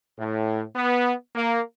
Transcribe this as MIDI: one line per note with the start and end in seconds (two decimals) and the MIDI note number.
0.18 0.64 45
0.76 1.13 59
1.35 1.60 58